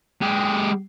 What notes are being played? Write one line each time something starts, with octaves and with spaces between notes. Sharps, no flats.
G#3 G4